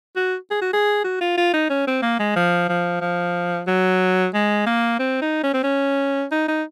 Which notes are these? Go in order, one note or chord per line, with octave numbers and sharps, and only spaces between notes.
F#4
G#4
F#4
G#4
F#4
F4
F4
D#4
C#4
C4
A#3
G#3
F3
F3
F3
F#3
G#3
A#3
C4
D#4
C#4
C4
C#4
D#4
D#4